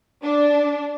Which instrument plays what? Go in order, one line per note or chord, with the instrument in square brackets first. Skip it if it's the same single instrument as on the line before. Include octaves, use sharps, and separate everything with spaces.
[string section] D4